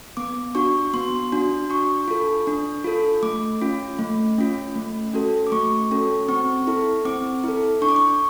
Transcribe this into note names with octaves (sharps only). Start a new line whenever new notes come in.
B3 D6
D4 F#4 C#6
B3 C6
D4 F#4
D4 C#6
F4 A4
D4
F4 A4
A3 D6
C#4 F4
A3
C#4 F4
A3
C#4 F#4 A4
D6
A3 C#6
C#4 F#4 A4
C4 C#6
E4 A4
C4 D6
E4 A4
D4 C#6
D6
C#6